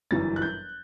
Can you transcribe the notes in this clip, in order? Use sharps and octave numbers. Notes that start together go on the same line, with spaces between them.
G1 F#2 E3 G3 A6
F#6
G6